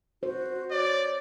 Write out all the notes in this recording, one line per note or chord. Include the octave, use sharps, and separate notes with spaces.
F#4 C5
C#5 D5